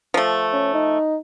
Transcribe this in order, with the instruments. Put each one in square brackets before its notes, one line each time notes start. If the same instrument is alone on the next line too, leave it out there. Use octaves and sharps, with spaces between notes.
[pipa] F3 A3
[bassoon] C#4
D#4